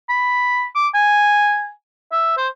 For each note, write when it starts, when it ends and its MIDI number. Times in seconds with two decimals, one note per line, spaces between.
0.09 0.66 83
0.75 0.88 86
0.94 1.69 80
2.12 2.35 76
2.37 2.48 72